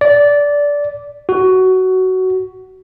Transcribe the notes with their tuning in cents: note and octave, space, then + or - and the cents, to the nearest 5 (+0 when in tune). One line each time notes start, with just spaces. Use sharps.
D5 -15
F#4 +15